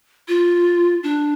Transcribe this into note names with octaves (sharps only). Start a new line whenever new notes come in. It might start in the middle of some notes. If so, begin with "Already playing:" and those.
F4
D4